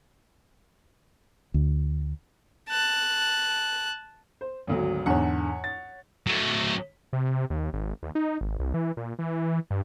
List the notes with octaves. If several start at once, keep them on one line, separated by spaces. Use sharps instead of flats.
D2
A5 F#6
C5
G#1 D2 F#3
E2 G#2 D3 C#5 F#5
A6
F#3 A3
C3
D#2
G#1
D#2
D#4
G#1
C2
E3
A#2
E3
G2